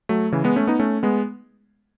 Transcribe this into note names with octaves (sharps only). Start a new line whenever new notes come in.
F#3 A3
C#3 E3
G#3 B3
A3 C#4
B3 D#4
A3 C#4
G#3 B3